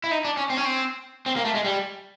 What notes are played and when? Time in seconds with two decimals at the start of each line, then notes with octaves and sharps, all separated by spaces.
0.04 E4
0.11 D#4
0.25 D4
0.37 C#4
0.50 C4
0.57 C#4
0.65 C4
1.26 C4
1.36 A#3
1.45 A3
1.55 G#3
1.65 G3